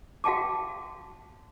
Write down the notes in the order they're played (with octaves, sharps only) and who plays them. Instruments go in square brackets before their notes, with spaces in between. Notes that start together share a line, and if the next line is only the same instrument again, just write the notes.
[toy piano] F#4 F5 G5 A5 D6